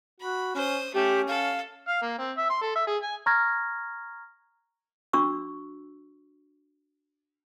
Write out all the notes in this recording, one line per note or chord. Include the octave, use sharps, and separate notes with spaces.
F#4 B5
C#4 C5 D#6
A3 C#4 G4
A4 F5
F5
A#3
C4
E5
C6
A4
E5
G#4
G#5
A#5 C#6 F6 G#6 A#6
D4 F#4 C#6 E6